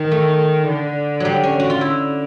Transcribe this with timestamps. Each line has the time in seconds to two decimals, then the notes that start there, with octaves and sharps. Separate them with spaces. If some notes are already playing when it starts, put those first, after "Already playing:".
Already playing: D#3
0.12 A3
0.68 D3
1.20 F#3 G3
1.43 C#4
1.60 F#4
1.70 F4
1.81 D3 E4